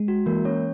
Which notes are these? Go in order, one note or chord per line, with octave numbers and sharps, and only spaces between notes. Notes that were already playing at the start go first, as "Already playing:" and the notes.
Already playing: G#3
F#4
E3 A#3 A#4
C#4 C#5